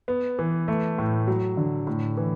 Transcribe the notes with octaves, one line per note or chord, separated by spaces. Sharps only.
B3
E3
A3
A2
F#3
D3
A2
E3